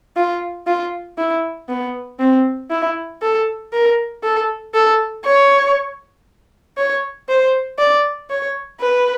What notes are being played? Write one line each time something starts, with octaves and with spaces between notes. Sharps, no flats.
F4
F4
E4
B3
C4
E4
A4
A#4
A4
A4
C#5
C#5
C5
D5
C#5
B4